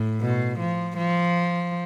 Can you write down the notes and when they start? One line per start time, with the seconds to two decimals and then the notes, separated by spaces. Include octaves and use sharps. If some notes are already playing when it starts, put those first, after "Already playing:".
Already playing: A2
0.21 B2
0.59 F3
0.97 F3